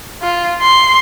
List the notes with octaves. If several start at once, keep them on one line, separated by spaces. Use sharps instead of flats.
F4
C6